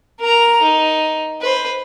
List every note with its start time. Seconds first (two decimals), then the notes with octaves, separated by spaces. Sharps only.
0.21 A#4 A#5
0.62 D#4
1.41 B4 C5